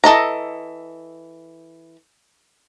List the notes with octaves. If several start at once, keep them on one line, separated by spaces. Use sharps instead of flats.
E3 A4 D#5 A#5